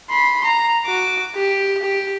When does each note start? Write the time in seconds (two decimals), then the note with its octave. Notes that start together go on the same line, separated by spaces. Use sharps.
0.10 B5 C6
0.45 A#5
0.86 F#4 D6
1.35 G4
1.82 G4